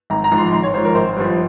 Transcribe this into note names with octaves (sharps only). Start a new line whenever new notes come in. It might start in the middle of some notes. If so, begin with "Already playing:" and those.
G#1 A#5
A#5
G#2 F3
C6
G#1 C6
C#5
G#2 F3 C5
A#4
G#1 C5
G2 F3
C5